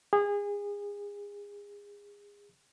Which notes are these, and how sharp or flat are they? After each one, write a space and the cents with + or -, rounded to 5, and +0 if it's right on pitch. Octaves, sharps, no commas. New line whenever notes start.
G#4 -30